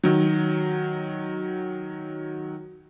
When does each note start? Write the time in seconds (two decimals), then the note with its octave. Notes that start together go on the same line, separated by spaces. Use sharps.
0.04 D#3 F#3